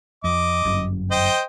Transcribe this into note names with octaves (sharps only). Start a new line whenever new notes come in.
F2 D#5 D6
G1 F#2
C5 D#5 G5